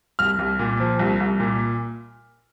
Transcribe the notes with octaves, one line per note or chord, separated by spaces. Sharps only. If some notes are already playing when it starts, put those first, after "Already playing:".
C2 F6
C2
A#2
F3
C2
C2
A#2